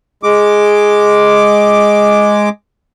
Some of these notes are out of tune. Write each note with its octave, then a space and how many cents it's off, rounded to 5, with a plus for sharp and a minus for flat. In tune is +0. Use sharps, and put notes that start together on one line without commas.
G#3 +0 D6 +0